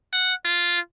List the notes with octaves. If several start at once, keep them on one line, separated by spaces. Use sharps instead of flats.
F#5
F4